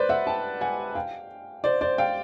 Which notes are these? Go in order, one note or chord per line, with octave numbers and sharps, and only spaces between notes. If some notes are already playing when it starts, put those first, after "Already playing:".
Already playing: B4 C5 D5
E5 F#5
G5 A5
F#5 G#5
F5 G5
C5 D5
C5 D5
F5 G5